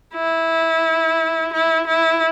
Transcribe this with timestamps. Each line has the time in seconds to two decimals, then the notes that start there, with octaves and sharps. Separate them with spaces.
0.14 E4
1.53 E4
1.86 E4